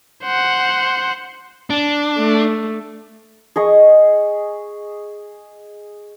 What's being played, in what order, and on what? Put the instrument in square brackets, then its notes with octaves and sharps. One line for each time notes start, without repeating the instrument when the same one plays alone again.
[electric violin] C5 F#5
[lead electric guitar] D4
[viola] A3
[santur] G#4 D#5 C#6